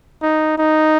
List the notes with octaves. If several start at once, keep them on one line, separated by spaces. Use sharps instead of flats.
D#4
D#4